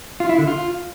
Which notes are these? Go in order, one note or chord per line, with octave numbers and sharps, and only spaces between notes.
F4
E4
D3
F4